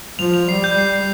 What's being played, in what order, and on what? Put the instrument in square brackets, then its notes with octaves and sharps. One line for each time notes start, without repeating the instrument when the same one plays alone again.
[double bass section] F3 [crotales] F7
[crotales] F7
[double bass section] G3 [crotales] C7
[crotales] G6
C7
C7